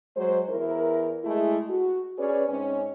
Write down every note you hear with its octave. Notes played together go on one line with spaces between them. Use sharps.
F#3 G#3 C5
E2 E4 A#4
G#3 A3 E4 G#4
F#4
C#4 G#4 B4 C#5 D5
G#2 C4 C#4